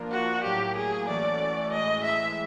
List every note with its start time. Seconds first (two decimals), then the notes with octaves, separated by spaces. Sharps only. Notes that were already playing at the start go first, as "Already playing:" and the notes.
Already playing: F3 A#3 D4 F4 A#4
0.12 F#4
0.44 A2 F#3 A#3 G4
0.76 G#4
1.08 E3 A3 C#4 F#4 A4 D5
1.72 A2 E3 G#3 D#5
2.04 E5